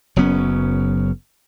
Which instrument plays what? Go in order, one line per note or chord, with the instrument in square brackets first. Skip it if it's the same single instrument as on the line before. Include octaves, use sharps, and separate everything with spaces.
[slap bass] F#1 F#3 B3 C#4